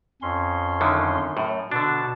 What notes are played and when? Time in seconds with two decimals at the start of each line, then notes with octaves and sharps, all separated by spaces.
0.22 F2 C#4 C6
0.81 F#2 D3 D#3
1.37 F#2 A2
1.72 B2 D3 D4 A5